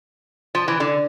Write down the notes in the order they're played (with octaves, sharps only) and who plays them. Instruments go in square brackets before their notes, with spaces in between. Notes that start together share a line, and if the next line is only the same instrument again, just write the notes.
[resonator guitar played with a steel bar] F3
E3
D3